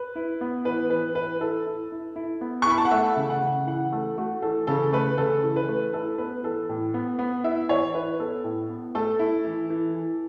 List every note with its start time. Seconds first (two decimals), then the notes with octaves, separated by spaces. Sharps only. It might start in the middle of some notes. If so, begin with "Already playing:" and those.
Already playing: B4
0.16 E4
0.41 B3
0.65 E3 B4
0.90 E3 B4
1.15 E4 B4
1.41 E4 A4
1.67 E4
1.92 E4
2.16 E4
2.41 B3
2.62 C#6
2.66 E4 B5
2.78 A5
2.85 F#5
2.91 A3 E5
3.17 C#3
3.30 F#5
3.42 C#3
3.67 E3 F#5
3.92 A3 A4
4.18 A3 F#4
4.42 E3 A4
4.67 C#3 A4
4.93 A3 B4
5.18 C#3 A4
5.43 E3
5.56 B4
5.69 A3
5.93 E4 A4
6.18 B3 B4
6.43 E3 A4
6.69 A2
6.94 B3
7.19 B3
7.44 E4 E5
7.69 E3 C#5
7.94 E4 B4
8.19 B3 A4
8.44 A2
8.69 B3
8.95 A3 A4
9.19 E4
9.45 E3
9.70 E3
9.95 E3